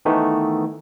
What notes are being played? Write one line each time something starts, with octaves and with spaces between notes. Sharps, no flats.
D#3 E3 A3 B3 D#4